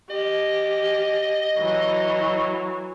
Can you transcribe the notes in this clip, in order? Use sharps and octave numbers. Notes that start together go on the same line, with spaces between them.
G4 D#5
E3 F#3